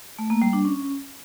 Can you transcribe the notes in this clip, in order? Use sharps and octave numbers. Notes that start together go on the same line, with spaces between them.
A3
A#3
G3
D4
C#4